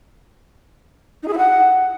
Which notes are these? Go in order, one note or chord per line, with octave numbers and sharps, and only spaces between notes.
D#4
G#4
E4
F#5